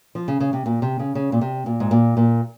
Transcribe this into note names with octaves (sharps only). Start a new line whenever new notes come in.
F3
C#3
C#3
C3
A#2
C3
C#3
C#3
A#2
C3
A#2
G#2
A#2
A#2